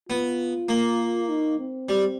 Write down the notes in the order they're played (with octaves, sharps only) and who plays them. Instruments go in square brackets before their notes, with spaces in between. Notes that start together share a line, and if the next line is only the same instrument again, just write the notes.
[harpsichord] B3 [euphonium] F4
[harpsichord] A#3
[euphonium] D#4
C4
[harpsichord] G3